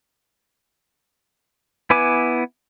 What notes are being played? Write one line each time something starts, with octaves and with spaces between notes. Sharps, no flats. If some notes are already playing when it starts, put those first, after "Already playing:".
B3 E4 B4 G#5 D6